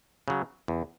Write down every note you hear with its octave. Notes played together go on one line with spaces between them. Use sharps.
C#3 F#3
E2